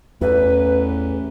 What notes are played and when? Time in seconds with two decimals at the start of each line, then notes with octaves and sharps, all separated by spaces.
0.21 A1 E2 B4